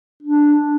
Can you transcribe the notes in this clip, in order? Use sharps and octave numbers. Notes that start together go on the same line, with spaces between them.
D4